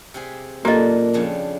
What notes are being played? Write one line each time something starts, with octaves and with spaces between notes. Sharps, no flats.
C3 G4 G#4
F#2 A#2 A#3 D4 G4 A4 D#5
F2 C#3 D4